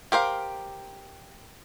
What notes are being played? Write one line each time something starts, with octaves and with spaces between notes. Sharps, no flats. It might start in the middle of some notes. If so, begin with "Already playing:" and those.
G4 A#4 C5 F5